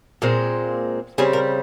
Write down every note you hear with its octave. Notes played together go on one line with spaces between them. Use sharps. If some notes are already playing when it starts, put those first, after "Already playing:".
A#2 G#3 C4
C#3 G3 C4 G#4
A#4